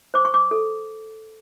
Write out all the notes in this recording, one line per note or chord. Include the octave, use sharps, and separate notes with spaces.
C5 D6
C#6
D6
A4